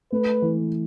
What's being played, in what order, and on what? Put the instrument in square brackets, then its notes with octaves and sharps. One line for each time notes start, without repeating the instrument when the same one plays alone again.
[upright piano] A3 [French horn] B4
[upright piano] E3